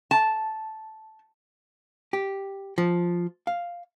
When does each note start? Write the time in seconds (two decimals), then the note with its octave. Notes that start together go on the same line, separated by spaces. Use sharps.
0.11 A5
2.13 G4
2.78 F3
3.47 F5